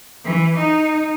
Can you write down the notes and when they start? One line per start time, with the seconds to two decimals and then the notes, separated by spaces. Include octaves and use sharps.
0.25 E3
0.59 D#4